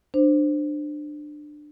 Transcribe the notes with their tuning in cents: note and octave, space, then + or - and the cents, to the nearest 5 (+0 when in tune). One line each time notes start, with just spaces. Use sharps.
D4 +20 C5 +0